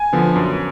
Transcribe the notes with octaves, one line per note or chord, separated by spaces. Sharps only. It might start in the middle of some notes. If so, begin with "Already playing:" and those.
Already playing: G#5
D3 F3 B3
F#2